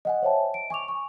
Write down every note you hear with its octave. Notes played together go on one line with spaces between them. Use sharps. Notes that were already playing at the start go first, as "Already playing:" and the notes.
D#5 F#5 G#5
C5 C#5 E5 G5 A5
D7
G#5 C#6 D6 F7
C#6